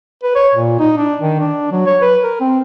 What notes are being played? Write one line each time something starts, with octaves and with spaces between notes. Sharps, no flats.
B4
C#5
A#2
D#4
D4
D#3
D4
F#3
C#5
B4
A#4
C4